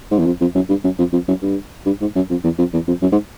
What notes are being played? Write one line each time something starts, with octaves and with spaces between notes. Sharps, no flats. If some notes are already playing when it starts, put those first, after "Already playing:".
G#2
E2
F2
F2
F#2
G2
F#2
F2
F2
F#2
G2
G2
G#2
F#2
F2
E2
F2
E2
F2
F#2
G#2